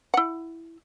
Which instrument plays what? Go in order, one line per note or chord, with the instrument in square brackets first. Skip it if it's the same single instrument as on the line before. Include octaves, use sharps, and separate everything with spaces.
[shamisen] E4 F#5